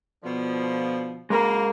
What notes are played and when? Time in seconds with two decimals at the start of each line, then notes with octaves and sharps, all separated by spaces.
0.23 B2 D3 F3
1.30 C#3 F#3 G#3 A#3 A#4